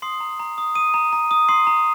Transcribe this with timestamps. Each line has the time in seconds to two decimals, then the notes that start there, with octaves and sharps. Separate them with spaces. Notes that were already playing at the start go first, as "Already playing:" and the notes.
0.02 C6 D#6 C7
0.20 A#5
0.40 A#5
0.58 D#6
0.75 D#6 D#7
0.94 A#5
1.13 A#5
1.31 D#6
1.49 C6 D#6 C7
1.67 A#5